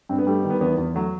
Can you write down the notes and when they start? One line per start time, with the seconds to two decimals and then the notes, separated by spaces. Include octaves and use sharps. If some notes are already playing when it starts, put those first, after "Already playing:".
0.09 G2 C4
0.18 B3
0.27 G3 A3
0.39 B3
0.45 D#3
0.50 B3
0.61 E2 B3
0.78 E2
0.95 F#3 A3